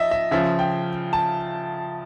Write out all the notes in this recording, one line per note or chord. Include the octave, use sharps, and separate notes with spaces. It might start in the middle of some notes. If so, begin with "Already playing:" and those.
Already playing: F3 D#5 E5
E5
C#3 F3 E5
G5
A5